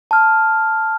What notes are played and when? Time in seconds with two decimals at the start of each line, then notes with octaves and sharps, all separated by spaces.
0.11 A5 F6